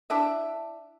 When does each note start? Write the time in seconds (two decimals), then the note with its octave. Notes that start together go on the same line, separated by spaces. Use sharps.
0.10 D4 E4 E5